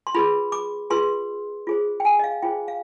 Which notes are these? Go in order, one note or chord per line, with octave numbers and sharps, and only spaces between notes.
C6
F4 G#4 B4 B5
D6
F4 G#4 B4 C6
F4 G#4 C5
G5
G#5
D#5
F5
F4 G#4 C5 G5
F5